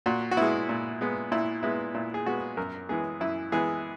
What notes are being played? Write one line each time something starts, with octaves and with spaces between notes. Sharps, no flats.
A#2 F#4
F#4
G#3 B3 E4
A#2
G#3 B3
A#2 E4
G#3 B3 E4
A#2 E4
G#4
G#3 B3 F#4
F#2 A#4
E3 G#3 B3 G#4
F#2 E4
E3 G#3 B3 G#4